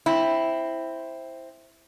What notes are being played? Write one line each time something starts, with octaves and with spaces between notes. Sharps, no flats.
C4 E4